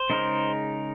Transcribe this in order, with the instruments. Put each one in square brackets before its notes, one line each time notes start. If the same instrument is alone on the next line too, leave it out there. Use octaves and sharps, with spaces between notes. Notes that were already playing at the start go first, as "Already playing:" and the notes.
Already playing: [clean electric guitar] C5
[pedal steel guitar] C#3 G#3 D#4 A#4